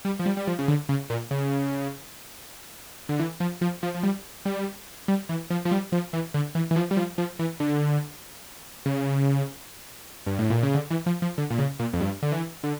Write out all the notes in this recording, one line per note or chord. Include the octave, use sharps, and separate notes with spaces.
G3
F3
G3
G3
F3
C#3
D3
C#3
A#2
C#3
D3
E3
F3
F3
F3
F3
G3
G3
G3
E3
F3
F3
G3
F3
E3
D3
E3
E3
F3
G3
F3
F3
E3
D3
C#3
G2
A2
A#2
C#3
D3
E3
F3
F3
D3
A#2
C#3
A#2
F2
G2
D3
E3
D3